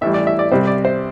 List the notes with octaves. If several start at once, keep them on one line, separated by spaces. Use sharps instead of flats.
A1 A2 E3 G3 E5
D5
E5
D5
C2 C3 G3 C5
D5
C5